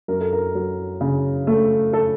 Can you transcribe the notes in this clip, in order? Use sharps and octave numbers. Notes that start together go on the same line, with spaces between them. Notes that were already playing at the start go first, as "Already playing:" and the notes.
F#2 A#4
A4
A#4
F#3
C#3
A3
A4